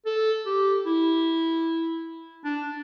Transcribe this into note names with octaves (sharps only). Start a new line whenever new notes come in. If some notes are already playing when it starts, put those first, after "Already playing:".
A4
G4
E4
D4